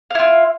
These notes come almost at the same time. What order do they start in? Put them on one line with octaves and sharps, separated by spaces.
F5 E4 F4